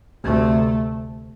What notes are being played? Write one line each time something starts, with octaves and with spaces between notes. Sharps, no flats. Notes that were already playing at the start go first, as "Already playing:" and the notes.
D2 C3 A3